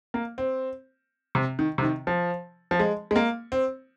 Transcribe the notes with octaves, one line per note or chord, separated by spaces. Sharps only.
A#3
C4
C3
D#3
C3
D#3
F3
F3
G#3
G#3
A#3
C4